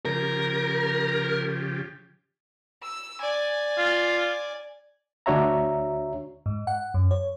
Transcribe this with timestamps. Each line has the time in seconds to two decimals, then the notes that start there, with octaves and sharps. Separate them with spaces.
0.05 C#3 F3 G4 A#4
2.82 E6
3.21 D5 G#5
3.78 F4
5.26 D2 D4 F#4 C#5 E5 A#5
6.46 G#2
6.67 F#5
6.94 F#2
7.11 C#5